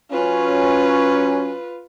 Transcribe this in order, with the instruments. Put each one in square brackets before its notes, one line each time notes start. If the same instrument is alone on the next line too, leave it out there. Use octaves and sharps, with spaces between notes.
[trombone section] F#3 C#4 [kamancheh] F4 B4